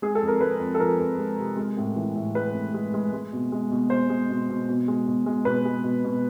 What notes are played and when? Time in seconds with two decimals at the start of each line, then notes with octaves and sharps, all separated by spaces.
0.02 G#3 G#4
0.15 A4
0.22 F2
0.28 A#4
0.41 G#3 B4
0.60 F2
0.75 A4
0.80 F3 A#4
1.00 F2
1.18 G#3
1.38 C3
1.57 G#3
1.77 A2
1.96 E3
2.15 A2
2.35 G#3 B4
2.54 A2
2.74 G#3
2.94 G#3
3.13 G#3
3.33 B2
3.52 G#3
3.71 B2
3.90 B2 C5
4.10 G#3
4.30 B2
4.49 B2
4.69 B2
4.88 G#3
5.07 B2
5.26 G#3
5.45 B2 B4
5.65 G#3
5.84 B2
6.05 B2